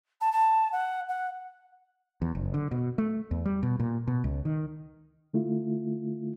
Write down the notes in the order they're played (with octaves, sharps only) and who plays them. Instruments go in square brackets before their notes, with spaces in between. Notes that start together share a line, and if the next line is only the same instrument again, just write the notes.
[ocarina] A5
A5
F#5
F#5
[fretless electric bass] E2
F#1
D3
B2
A3
E2
G3
B2
A#2
B2
C#2
D#3
[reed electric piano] D3 A3 E4 F4